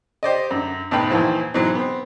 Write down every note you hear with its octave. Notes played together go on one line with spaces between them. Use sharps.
G4 C5 D5 D#5
F#2 D3
D2 G#2 B2 B4 G5 B5
D#2 A#2 E3 F3
G#2 B2 E3 F#3 C4
B3 C4